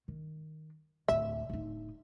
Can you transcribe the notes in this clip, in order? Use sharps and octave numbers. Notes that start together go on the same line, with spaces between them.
D#3
D1 D2 E5
D1 D#4